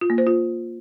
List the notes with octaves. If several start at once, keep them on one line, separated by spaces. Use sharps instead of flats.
F4
A#3
C5
F4